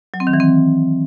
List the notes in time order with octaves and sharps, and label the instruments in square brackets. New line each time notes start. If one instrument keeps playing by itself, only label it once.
[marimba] F#3
C4
D#3
E3
C4